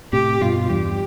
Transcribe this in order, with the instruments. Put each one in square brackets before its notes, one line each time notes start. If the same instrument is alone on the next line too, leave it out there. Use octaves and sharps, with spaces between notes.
[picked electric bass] A2 C3 [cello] G4
[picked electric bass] G2 B2 [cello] F4
[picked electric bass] E2 G2 [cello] G4